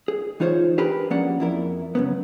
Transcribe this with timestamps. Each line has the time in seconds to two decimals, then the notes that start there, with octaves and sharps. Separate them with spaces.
0.08 G#4
0.40 E3 D#4 F4 C5 C#5
0.78 D4 G4 G#4 A#4 B4
1.10 F3 A#3 C#4 G#4 D5 F#5
1.40 F2 E4 A#4
1.95 F#2 C#3 B3